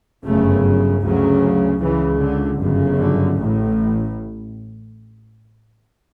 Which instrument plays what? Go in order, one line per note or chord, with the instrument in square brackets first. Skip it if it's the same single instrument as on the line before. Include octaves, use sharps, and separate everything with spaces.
[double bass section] G1 F#2 C#3 A3
D2 C#3 F#3
C#2 C#3 E3
D3
G1 F#2 C#3
D3
A1 A2